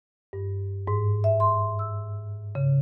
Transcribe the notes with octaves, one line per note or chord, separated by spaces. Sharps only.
G2
G#2
E5
C6
E6
C#3